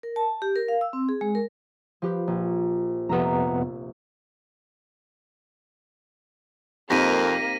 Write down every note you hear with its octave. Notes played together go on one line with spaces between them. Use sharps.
A#4
A5
G4
A#4
F5
E6
C4
G#4
G#3
A#4
F3 G4 B4
A#1
F1 F2 C3 B3 E5 A#5
F2 A#3 C4 D#4 G4 A#6 B6 D#7